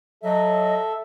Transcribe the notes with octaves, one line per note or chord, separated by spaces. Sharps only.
F#3 A4 D#5 E5